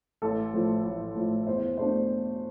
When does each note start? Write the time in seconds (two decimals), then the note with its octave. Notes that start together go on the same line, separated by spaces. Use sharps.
0.22 A1 A4
0.53 A2 F3 A3
0.84 A1
1.15 A2 F3 A3
1.47 E2 C5
1.77 B2 A3 D4 C5